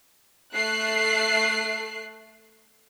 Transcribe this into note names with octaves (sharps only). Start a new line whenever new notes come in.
A3 F#6 C7